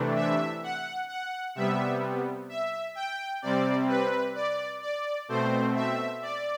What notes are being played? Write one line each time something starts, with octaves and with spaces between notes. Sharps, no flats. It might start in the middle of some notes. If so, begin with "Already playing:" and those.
Already playing: C3 E3 A3 D4
E5
F#5
F#5
C3 G3 B3 E5
E5
G5
C3 G3 C4 D5
B4
D5
D5
B2 A3 C4 C5
E5
D5